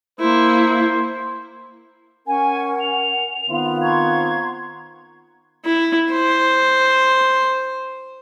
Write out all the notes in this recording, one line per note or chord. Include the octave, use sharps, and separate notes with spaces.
A#3 E4 C5
C#4 A#4 F#5 G#5
F7
D#3 B3 C4 F4 F5 C6
A#5 C6 C#6 G#6
E4
C5